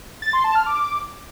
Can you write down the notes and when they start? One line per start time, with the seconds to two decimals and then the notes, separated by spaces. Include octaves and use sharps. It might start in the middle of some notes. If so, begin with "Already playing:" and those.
0.22 A6
0.33 C6
0.44 A5
0.55 F6
0.66 D6